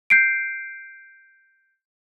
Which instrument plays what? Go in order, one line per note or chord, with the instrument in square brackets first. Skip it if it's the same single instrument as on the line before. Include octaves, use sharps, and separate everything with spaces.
[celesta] G6 C7 D7